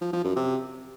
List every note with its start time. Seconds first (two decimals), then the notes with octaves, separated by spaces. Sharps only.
0.01 F3
0.13 F3
0.24 F#2
0.36 C3